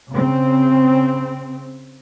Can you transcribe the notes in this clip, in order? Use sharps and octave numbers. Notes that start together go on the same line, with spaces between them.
C#3 C4